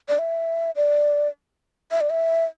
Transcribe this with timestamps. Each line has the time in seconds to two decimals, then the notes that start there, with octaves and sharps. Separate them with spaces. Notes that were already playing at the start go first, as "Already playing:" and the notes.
0.08 D5
0.19 E5
0.76 D5
1.91 E5
2.01 D5
2.10 E5